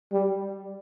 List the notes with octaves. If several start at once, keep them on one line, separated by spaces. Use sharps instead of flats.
G3